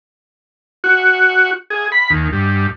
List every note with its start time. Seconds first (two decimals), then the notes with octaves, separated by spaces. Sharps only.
0.84 F#4
1.70 G#4
1.92 B5
2.10 D#2
2.33 G2